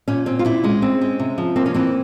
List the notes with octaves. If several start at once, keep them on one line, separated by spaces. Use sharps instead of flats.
A#2 C#4
C4 C#4
F4
A#2 E4
G#3 C#4
C4
G#3
C3
F3
A#3 C4
C#4
E3 C4